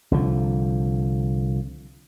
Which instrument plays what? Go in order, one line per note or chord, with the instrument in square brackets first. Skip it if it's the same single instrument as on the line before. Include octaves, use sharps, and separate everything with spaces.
[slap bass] C2 D3 F3